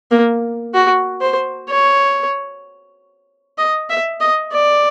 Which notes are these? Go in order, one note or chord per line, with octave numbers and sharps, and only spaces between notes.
A#3
F#4
C5
C#5
D#5
E5
D#5
D5